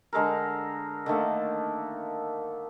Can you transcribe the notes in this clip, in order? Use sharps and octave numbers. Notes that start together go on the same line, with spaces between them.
D3 G#3 A4 A#4
D3 D#3 A3 A#3